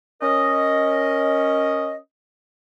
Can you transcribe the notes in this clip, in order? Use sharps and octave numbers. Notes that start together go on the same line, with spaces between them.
C#4 A#4 D#5